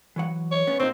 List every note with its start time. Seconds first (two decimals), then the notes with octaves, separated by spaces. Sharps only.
0.16 E3 F#3 F#5
0.52 C#5
0.67 B3 C#4
0.80 A#2 C4 D#4